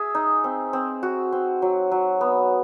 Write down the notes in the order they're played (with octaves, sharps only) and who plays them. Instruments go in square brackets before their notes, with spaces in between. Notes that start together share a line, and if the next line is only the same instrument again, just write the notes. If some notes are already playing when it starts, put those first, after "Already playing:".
Already playing: [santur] G#4 E5
D#4
C4
C4
F#4
C4
F#3
F#3
B3